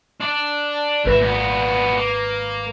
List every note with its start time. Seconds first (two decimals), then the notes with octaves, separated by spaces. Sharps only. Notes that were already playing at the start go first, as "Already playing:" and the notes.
0.21 D4 D5
1.05 G#1 C#2 B4 E5 A#6
1.21 A#2 B3
1.97 A#3